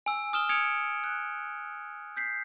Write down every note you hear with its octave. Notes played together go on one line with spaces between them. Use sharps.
G#5 E6
D#6 F6 E7 G7
D#6 G#6 C#7 D7 F7
F#6
G6 B6 C7